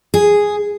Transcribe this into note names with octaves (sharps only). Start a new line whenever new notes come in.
G#4